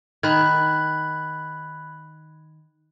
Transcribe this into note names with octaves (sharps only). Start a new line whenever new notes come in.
D#3 B5 F#6 G#6